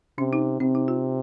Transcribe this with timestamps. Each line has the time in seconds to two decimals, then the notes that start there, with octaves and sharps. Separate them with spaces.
0.18 C3 C#4
0.33 D#4
0.60 C3 C4
0.75 D#4
0.88 F4